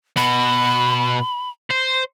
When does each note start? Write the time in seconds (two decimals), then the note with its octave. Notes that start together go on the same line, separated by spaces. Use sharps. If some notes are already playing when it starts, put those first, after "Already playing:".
0.17 B2 F#4 B5
1.70 C5